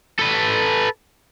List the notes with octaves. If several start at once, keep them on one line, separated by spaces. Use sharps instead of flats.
A4 B4